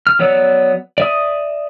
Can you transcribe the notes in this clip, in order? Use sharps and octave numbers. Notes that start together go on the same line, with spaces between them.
F6
F#3 B3 C#5 D5 E6
D5 E5 D#6